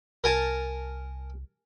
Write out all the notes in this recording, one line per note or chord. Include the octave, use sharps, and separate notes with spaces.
C2 A#4 G#5 A5